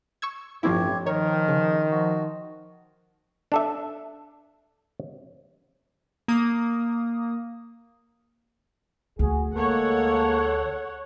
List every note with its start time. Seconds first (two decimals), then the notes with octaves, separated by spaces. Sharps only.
0.22 C#6 E6 G#6
0.63 A1 G2 F3 C4 E4 G4 C#5
1.06 D#3 F3 A#4 C#5
1.48 C#3
1.91 F3 F#4
3.52 D4 A4 E5
6.28 A#3 D#6
9.19 D2 F#4 G#4
9.55 G#3 A#3 A4 C#5 F#5